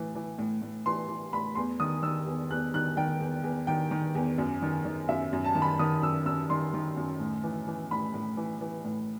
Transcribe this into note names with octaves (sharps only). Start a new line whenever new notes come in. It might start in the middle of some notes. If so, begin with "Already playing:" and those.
Already playing: A2 E3
E3
A2
A2
E3 C6
E3
A2 B5
E2 C6
D#3 D#6
D#3 E6
E2
E2 F#6
D#3 F#6
D#3 G5
E2
E2
D#3 G5
D#3
E2
F#2
D#3
D#3
F#2 E5
F#2
A5
D#3
B5
D#3 D#6
F#2 E6
F#2 E6
D#3 C6
D#3
F#2
A2
E3
E3
A2 B5
A2
E3
E3
A2